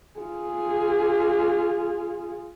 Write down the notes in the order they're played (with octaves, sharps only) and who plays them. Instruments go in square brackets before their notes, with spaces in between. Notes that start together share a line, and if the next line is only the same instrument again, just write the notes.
[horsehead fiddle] F4 G#4